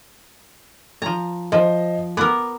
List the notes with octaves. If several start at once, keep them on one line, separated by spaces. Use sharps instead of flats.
F3 A#5
F3 C5 D#5
B3 A#4 D6